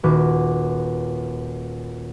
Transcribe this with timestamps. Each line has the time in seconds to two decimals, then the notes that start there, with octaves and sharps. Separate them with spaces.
0.03 D#1 F#4 B4 D6